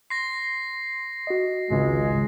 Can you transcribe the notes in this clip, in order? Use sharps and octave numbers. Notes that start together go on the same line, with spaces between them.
C6 A#6 C7
F#4 D#5
G#1 C#2 G#3